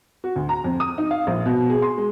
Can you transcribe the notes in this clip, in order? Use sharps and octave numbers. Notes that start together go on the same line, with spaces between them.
F#4
D2
A#5
F2
D#6
D#4
F5
A#1
B2
G#4
C6
G#3